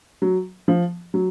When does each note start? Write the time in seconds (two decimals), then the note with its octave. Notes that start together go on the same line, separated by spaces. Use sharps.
0.22 F#3
0.68 F3
1.14 F#3